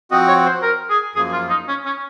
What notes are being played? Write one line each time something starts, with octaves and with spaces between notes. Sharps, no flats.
F3 C4 F#4 D#5
C#5
C5
A#4
G#4
F#2 F3 A#3 G#4
F4
D#4
C#4
C#4